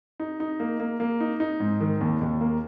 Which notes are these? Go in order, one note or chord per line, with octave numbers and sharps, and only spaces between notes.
D#4
D#4
A#3
A#3
A#3
D#4
D#4
G#2
D#3
D#2
D#2
A#3